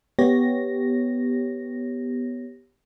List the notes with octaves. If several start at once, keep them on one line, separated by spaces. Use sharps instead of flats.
B3 G4 C#5 A#6